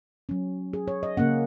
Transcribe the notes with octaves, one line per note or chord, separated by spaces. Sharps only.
F#3 C#4
G#4
C#5
D#5
C#3 A#3 C#4 F#5